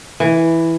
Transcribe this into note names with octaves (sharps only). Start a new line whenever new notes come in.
E3